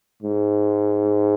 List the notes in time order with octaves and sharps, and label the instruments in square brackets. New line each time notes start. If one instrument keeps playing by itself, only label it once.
[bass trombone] G#2